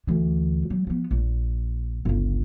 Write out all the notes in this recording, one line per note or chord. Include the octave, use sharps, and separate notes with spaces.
D2 E3
F#3
F3 B3
A#1
G1 C#2